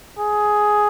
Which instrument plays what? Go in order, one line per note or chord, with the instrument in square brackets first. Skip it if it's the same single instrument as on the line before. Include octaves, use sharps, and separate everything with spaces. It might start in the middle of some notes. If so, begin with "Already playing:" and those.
[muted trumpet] G#4